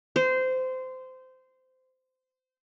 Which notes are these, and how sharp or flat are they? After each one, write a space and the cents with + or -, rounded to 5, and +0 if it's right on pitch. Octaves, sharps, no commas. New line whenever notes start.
C5 -20